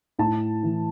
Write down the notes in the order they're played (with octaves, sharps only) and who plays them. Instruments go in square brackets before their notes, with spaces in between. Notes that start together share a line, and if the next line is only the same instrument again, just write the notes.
[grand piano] A2 A5
E3